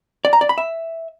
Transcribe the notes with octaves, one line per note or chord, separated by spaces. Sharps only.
D5
A#5
D5
B5
E5